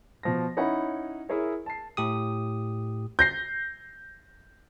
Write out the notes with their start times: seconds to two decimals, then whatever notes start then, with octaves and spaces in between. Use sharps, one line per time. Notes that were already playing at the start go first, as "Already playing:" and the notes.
0.23 B2 F3 A#6
0.57 C#4 D#4 E4 C#5 F#5 B5
1.29 E4 G#4 A#4 C#5 E5
1.66 A5 C7
1.97 A2 G4 D#6
3.19 G6 A#6 C7